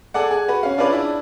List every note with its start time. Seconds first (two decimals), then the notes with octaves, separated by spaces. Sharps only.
0.14 G#4 A4 D5 F#5
0.31 G#4
0.48 F#4 B4
0.63 C#4 F5
0.77 C#4 D4 F4 G#4 B4 D5
0.91 D4 E4